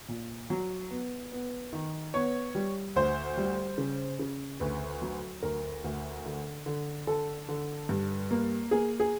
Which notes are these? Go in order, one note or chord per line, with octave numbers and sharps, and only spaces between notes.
A#2
F#3
B3
B3
D#3
B3 C#5
G3
D2 C5
G3
C#3
C#3
D2 B4
F#3
D2 A#4
D2
D3
D3
D3 A4
D3
G2
A#3
A#3 G#4
G#4